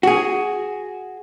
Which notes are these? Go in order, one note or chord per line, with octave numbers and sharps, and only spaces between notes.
F#4 G#4